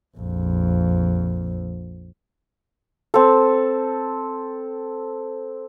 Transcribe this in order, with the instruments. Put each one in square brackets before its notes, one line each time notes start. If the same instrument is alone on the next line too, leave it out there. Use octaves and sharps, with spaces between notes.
[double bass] A#1 F2
[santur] C4 A4